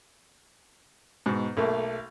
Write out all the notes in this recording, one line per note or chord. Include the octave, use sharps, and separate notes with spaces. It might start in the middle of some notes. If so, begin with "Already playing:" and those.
G#2 B2
B1 A3 A#3